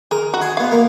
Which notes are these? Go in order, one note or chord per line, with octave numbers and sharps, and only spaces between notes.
G#4 A#4
F#4
G#4
B3 F5
A#3